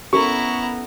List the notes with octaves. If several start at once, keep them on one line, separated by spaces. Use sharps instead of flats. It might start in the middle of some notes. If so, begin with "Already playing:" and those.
B3 C#4 E4 A4 A#4 A#5 C#6